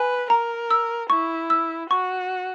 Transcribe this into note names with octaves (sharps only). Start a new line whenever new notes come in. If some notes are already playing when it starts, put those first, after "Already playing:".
Already playing: B4 G#5
A#4 A#5
E6
E4 C#6
E6
F#4 C#6